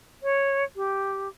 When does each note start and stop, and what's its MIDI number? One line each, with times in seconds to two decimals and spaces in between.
0.23 0.64 73
0.76 1.28 67